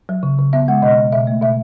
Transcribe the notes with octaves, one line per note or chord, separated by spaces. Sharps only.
F#3
C#3
C#3
B3 E5
G#3 F#5
B2 D#5
B2
B2 E5
A3
B2 E5